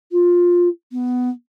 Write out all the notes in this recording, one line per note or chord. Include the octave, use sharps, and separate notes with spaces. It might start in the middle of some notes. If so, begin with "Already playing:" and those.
F4
B3